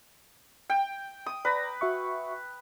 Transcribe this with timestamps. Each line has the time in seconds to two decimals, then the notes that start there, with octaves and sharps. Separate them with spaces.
0.70 G5
1.26 D#6
1.45 B4 D5 A#5 A#6
1.81 F#4 E5 C#6